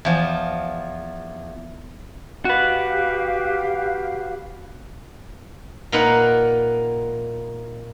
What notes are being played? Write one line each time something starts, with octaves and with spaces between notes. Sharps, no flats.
E2 F3
F#4 G4 B4 F5
A#2 A#3 D#4 A#4 B4 F#5